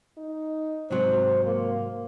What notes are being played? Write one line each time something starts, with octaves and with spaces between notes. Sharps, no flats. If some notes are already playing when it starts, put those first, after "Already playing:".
D#4
G#2 C3 F#3 C5
A#3